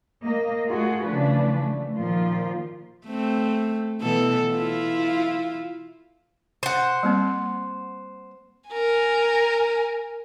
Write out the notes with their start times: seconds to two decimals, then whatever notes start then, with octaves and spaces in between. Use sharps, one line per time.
0.23 A#3 D#5
0.68 A3 F4 F#4 G#4
1.06 C#3 E3 F3 A3 D4 B4
1.61 A3
1.96 A#2 D#3 F3 A#3 F4
3.06 A3 C4
4.01 B2 E3 A4
4.53 E4 F4
6.63 C5 F#5
7.03 G3 A#3 C4
8.70 A#4 G#5